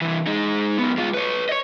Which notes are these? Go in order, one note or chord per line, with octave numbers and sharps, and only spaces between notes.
C2 E3
G#3 D#4
F#2 B3
G#3 F4
B4 C#5
C#5 D#5